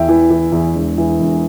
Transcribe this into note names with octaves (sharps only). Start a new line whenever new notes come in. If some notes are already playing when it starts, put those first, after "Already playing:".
Already playing: E2 E5 G5
E3
E3
E2
E1
E3
E1